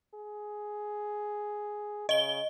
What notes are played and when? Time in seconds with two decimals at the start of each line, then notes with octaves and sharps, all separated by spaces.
0.14 G#4
2.09 C#3 D#5 G7